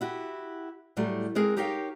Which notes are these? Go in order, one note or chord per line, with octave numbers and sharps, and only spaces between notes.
E4 F#4 G4
A2 F#3 G3 A3
G#3 C4 G#4 A#4
D#4 G4 A#4 C#5 F5 G5